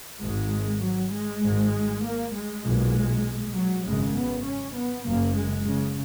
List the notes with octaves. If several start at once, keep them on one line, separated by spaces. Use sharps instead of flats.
G#1 G#2 G#3
F#3
G#3
G#1 G#2
A#3
G#3
B1 A#2
F#3
G#1 F#2 C#3 G#3
B3
C#4
B3
F#1 F#2 C#3 A#3
G#3
C#3